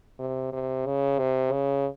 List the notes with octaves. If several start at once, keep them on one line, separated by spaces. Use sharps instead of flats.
C3
C3
C#3
C3
C#3